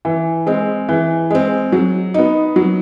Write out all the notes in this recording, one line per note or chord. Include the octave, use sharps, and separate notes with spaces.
E3
G#3 C4
E3
G#3 C4
F#3
B3 D#4
F#3